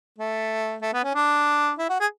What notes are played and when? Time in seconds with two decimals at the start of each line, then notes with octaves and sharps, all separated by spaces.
0.18 A3
0.82 A3
0.93 B3
1.04 C#4
1.15 D4
1.79 E4
1.89 F#4
2.00 G#4